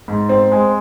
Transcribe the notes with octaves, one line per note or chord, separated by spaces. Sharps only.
G#2
C4
G#3